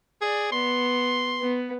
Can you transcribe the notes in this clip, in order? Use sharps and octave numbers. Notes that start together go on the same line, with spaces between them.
G#4 D5
B3 C6
B3